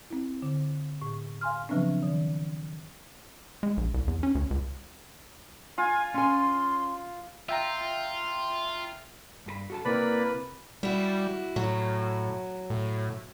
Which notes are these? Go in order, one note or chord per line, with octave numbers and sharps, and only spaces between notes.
C4 E4
D3
A2 C#6
F5 G#5 C6 F6
C#3 F3 F#3 B3 C4 D4
D#3
G#3
A#1
C2
E2
C#4
D2
C#2
F4 G#5
C#4 G#5 C6
F4 E5 G5 A#5
G2 G#4 B5
F#4 A4 A5
C3 A#3 C4 E4 B4 D5 B5
G3 E4 F#4
A2 F#3
A2